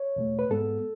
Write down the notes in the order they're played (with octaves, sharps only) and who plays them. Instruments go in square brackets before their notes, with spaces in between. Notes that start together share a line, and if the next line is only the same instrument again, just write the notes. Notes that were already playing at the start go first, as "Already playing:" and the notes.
Already playing: [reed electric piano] C#5
E2 B2 A3
B4
G#2 G#3 B3 A4